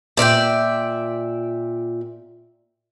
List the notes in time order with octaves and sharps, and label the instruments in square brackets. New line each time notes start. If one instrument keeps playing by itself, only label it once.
[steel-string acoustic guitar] A#2 D5 E5 G5